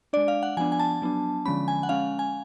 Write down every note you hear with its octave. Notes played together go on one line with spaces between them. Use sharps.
G#3 D4 D5
F5
F#5
F3 B3 D4 G#5
G#5
A5
F#3 B3 D4
D3 F3 G#3 C#4 B5
G#5
F#5
G#3 C#4 F5
G#5